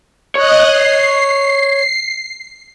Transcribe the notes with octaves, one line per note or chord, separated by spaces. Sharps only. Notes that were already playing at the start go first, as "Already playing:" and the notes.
C#5 D#5 F#6
C7